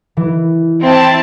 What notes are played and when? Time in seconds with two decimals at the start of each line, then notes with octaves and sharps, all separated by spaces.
0.17 E3
0.81 C4 E4 A5